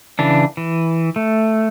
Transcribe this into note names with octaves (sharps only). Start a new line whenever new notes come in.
C#3 E3 D4
E3
A3